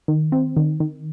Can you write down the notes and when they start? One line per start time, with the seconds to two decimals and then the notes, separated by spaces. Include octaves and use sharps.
0.08 D#3
0.32 C4
0.57 D#3
0.80 D#3